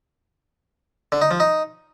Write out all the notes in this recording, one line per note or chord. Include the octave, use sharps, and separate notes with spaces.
D3
D#4
F3
D#4